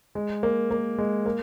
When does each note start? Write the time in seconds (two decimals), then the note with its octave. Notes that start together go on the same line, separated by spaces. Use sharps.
0.15 G#3
0.43 A#3
0.71 A#3
0.98 G#3
1.26 A#3